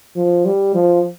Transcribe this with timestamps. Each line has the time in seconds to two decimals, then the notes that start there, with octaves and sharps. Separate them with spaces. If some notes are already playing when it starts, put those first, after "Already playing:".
0.16 F3
0.45 G3
0.74 F3